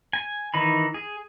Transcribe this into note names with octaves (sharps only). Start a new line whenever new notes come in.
G#5
D#3 E3 D#4 B5
G#4